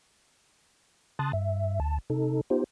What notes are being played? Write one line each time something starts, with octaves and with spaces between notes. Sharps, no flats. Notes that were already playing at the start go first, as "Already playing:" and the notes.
C#3 A5 C6 D#6 F#6 A6
G2 E5
D2 A5
C3 D#4 A4
B3 D#4 F4 G4 C5